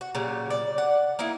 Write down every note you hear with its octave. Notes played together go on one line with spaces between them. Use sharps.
F#4
A#2 C#3 F#3 G3
D5
F#5
A#3 D#4 E4